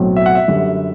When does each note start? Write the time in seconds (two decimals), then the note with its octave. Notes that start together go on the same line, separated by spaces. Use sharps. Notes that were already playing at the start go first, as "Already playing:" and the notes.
Already playing: B1 A2 F#3 C4
0.16 E5
0.26 F#5
0.35 E5
0.48 F#2 D3 G3